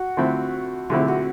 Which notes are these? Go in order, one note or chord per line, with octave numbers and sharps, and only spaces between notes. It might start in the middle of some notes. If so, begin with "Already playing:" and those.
Already playing: F#4
D3 F3 A3 C4 E4
D3 F3 A3 C4 E4 G4
F#4